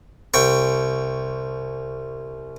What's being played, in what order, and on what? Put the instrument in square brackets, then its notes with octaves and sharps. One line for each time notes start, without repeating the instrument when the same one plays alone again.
[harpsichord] C2 G5 C#6